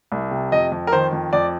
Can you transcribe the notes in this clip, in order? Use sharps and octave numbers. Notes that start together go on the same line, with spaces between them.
C2
C3
F2 D#5
F2
A#4
D#3 C5
F2
F2 D5